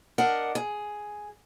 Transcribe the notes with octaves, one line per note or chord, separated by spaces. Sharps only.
D4 A#4 D#5 F#5
G#4